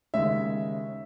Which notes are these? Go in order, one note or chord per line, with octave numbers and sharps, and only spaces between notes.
D#2 C#3 G#3 C#4 E5